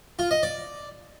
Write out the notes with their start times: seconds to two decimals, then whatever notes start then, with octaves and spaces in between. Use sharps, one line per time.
0.19 F4
0.31 D#5
0.43 D5